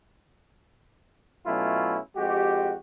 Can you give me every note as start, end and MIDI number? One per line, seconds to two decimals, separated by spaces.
1.46 1.97 47
1.46 1.97 54
1.46 1.97 57
1.46 1.97 61
1.46 1.97 64
1.46 1.97 65
2.16 2.73 41
2.16 2.73 56
2.16 2.73 66
2.16 2.73 67